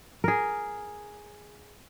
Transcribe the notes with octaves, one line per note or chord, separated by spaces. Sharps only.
G#4 A#4